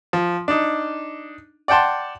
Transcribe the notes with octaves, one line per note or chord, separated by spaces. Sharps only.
F3
D4 D#4
D5 F#5 G5 A5 C6